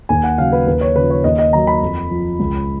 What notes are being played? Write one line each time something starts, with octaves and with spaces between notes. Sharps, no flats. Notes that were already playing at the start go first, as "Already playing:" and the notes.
D#2 G#5
F#5
C#3 F#3 F5
B4
D#2 B4
C#5
C#3 F3 B4
C#5
D#2 D#5
D#5
D#3 F#3 A#5
B5
F2
F3
C#2